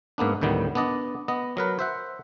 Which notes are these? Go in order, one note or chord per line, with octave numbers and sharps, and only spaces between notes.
G#2 A#3 B3 D4
D2 A2 D#3 G3 B3
B3 D4 D5 D#5
B3 D#5
F#3 A#4 B4
C5 E5 F#5